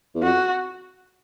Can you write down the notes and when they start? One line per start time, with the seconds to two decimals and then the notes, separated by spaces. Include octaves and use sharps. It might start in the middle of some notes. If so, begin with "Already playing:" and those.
0.15 E2
0.22 F2 F#4